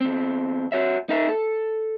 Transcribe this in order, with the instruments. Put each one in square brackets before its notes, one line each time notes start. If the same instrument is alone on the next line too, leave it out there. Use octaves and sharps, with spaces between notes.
[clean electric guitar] E2 C4
F#4 C#5 E5
D#4 A#4 E5
A4